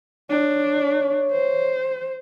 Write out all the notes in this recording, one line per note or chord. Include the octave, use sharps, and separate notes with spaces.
D4 C#5
C5